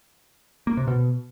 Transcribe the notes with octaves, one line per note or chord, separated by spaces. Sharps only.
A#3
C3
B2